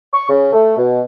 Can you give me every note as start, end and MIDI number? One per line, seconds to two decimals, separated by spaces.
0.13 0.28 85
0.30 0.52 49
0.53 0.76 57
0.77 1.00 47